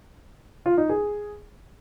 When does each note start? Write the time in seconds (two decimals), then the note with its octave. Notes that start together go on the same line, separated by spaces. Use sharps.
0.66 F4
0.78 D#4
0.89 G#4